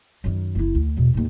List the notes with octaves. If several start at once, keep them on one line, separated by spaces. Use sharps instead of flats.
F#2 D#3
F#1 E4
D2
E2 B2
D#2 G#2